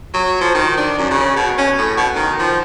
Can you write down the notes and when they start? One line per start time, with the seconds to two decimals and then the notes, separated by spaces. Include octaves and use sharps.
0.13 F#3
0.41 F3
0.54 D#3
0.77 D4
0.98 F#2
1.10 C#3
1.36 B2
1.58 C#4
1.78 A2
1.97 B2
2.15 D#3
2.39 F3